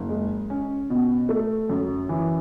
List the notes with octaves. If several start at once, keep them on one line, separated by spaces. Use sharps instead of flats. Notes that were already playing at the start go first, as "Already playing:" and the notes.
Already playing: F#1
G#3
C#4
B2
A3
F#2
E3